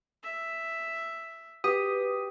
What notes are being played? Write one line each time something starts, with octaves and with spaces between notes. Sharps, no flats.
E5
G4 B4 D#6